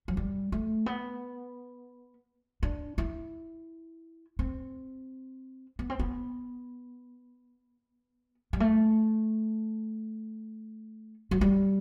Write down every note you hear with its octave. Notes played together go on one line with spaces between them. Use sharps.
F#3
G3
A3
B3
D4
E4
C4
B3
C4
B3
G3
A3
F#3
G3